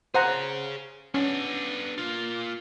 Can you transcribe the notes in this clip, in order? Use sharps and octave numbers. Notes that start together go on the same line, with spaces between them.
G#4 C5 C#5 F#5 A#5
B3 C#4 D4
A#3 F4